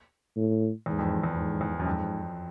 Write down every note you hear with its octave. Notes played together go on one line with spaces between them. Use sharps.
A2
E2 G#2
F2
F2
E2
F2 G#2
E2
F#2
F2 G#2